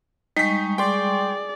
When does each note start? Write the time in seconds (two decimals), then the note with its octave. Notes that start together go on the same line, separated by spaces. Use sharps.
0.37 G3 G#3 D#4 C#6 B6
0.78 G#4 D5 G5 C6